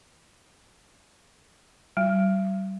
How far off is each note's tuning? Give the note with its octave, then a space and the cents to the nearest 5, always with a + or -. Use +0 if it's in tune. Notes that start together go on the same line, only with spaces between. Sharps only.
G3 -35